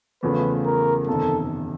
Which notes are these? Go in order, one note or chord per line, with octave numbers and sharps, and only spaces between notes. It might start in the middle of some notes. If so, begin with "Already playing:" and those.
E2 C#3 F3 A3 B4
A#4
F#1 E2 C3 D#3 A4